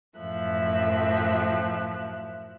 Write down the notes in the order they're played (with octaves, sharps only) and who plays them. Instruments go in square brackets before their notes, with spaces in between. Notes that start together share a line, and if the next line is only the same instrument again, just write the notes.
[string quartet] F#2 A2 F3 E5 F#6